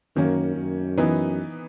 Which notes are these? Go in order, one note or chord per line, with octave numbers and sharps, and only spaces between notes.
F#2 D#3 A#3 C#4
F#2
E3 B3 D#4